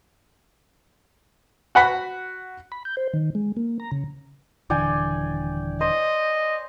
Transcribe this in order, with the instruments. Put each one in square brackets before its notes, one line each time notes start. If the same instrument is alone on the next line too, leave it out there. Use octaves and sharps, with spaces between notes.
[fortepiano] F#4 F#5 B5
[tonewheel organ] B5
G6
C5
D#3
G#3
A#3
A#5
C#3
[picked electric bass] D#1 D3 E3 [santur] D5 G5 G#5
[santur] C5 [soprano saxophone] D#5